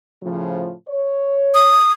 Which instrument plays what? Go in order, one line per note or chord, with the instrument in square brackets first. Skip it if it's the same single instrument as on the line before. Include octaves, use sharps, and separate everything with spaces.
[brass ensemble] A2 C#3 F3
C#5
[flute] D#6